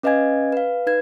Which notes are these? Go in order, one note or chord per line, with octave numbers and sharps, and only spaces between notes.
C#4 B4 D#5 F5 G#5 G#6
B4 F5
D#4 B4 G#6